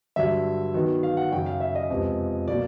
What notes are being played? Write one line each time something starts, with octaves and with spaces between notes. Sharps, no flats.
G2 D3 F#3 E5
D#3 F#3 B3 D#4
F5
F#5
F#2 C#3 F#3 G5
F5
E5
D#5
F2 C3 F3 G#3 B3
B2 F#3 A#3 D5